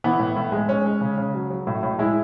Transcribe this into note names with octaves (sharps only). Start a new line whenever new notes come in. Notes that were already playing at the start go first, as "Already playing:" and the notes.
E3 B3
A2
A2
G#3
G#3 C#4
G#3
C#3
C#3
F#3
F#3
A2
A2
G#3 E4